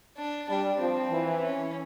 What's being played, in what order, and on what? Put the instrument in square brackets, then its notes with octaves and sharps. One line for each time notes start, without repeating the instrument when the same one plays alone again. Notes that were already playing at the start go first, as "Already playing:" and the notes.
[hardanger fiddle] D4
[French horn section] G3 [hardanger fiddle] D4
[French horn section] F3 [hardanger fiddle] C4
[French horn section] E3
[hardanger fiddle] C#4